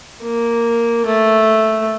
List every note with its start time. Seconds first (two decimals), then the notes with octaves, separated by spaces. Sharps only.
0.23 A#3
1.06 A3